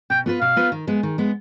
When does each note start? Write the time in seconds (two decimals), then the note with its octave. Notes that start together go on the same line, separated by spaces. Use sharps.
0.10 B2 G5
0.26 B3 F4 B4
0.41 B2 F5
0.56 B3 F4 B4
0.72 D#3
0.87 G#3 B3
1.03 D#3
1.18 G#3 B3